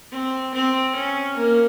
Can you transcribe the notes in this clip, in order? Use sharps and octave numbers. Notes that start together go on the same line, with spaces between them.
C4
C4
C#4
A#3